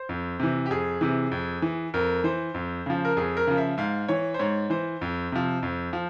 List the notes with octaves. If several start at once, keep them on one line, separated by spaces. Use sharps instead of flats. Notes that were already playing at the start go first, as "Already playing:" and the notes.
Already playing: C5
F2
C3 E3
G4
F2 G#4
C3 E3
F2
E3
F2 A#4
E3 C5
F2
C#3 F3
A#4
F2 G#4
A#4
C#3 F3
E5
G#2 F5
E3 C#5
C5
G#2 C#5
E3 C5
F2
C3 F3
F2
F3